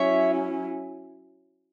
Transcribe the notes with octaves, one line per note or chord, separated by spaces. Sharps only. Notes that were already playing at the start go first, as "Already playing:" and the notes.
Already playing: F#3 C#4 E4 C#5 E5